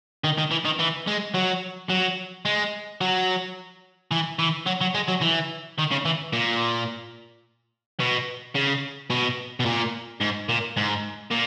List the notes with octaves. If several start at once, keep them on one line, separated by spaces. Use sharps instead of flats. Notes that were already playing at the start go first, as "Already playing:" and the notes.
D#3
D#3
E3
D#3
E3
G#3
F#3
F#3
G#3
F#3
E3
E3
F#3
F#3
G#3
F#3
E3
D#3
C#3
E3
A#2
B2
C#3
B2
B2
A#2
G#2
A#2
G#2
A#2